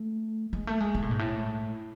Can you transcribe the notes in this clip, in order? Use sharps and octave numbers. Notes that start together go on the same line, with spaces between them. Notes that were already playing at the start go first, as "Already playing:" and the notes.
Already playing: A3
G#3
A3
G#3
B2
A2
G#2
A2